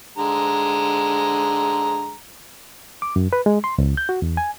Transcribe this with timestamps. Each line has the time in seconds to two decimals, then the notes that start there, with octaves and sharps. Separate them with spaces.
0.18 D3 G#3 A#5
3.02 D6
3.16 F#2
3.33 B4
3.46 G#3
3.64 C6
3.78 C#2
3.97 G6
4.09 F#4
4.22 E2
4.37 G#5